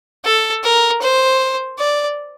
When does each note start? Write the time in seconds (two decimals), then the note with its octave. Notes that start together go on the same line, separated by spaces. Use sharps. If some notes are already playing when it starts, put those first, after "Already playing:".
0.25 A4
0.64 A#4
1.02 C5
1.79 D5